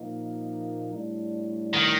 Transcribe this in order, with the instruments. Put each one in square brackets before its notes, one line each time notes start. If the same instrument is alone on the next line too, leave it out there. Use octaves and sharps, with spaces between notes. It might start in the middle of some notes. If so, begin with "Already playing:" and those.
Already playing: [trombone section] A#2 F3 A#3 D#4
A2 G3 D4
[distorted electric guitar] D#3